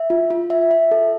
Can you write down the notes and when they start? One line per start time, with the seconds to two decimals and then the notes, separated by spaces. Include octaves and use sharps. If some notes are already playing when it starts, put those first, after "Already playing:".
Already playing: E5
0.10 F4
0.30 F4
0.50 E5
0.71 E5
0.91 A4